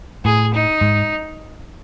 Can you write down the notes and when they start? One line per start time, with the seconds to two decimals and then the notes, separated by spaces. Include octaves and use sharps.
0.25 A2 G#4
0.53 D#4
0.81 G#2